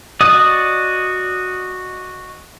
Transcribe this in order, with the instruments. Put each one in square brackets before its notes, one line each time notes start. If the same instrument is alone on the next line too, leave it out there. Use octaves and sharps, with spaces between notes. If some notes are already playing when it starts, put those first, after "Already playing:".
[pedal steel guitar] F#4 D5 D#5 D#6